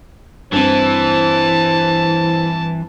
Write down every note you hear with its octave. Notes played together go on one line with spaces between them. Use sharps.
G2 E3 C4 C5 A5